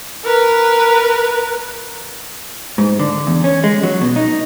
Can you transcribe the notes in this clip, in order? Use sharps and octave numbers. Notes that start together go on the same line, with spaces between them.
A#4 B4
G#2
D3
E2
C#4
G#3
F#3
B2
D#4